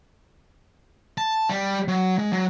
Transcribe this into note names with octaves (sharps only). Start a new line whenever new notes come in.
A5
G3
F#3
G#3
F#3